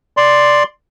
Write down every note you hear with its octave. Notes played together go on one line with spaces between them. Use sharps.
D5 C6